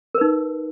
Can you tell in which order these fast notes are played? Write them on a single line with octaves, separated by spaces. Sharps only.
A#4 B4 D#4